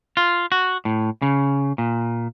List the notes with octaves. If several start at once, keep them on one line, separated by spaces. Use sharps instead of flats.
F4
F#4
A2
C#3
A#2